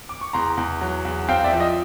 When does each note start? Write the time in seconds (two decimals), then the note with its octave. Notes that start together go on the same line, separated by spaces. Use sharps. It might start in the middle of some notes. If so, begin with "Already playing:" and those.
0.09 D6
0.21 C#6
0.33 E2 A#5 C6
0.57 E2
0.81 F#3
1.05 E2
1.29 C4 F5 G5
1.44 D5 E5
1.52 F3
1.60 D#5